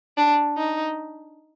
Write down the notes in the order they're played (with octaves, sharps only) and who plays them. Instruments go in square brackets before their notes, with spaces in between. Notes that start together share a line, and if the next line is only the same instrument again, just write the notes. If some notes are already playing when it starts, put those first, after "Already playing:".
[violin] D4
D#4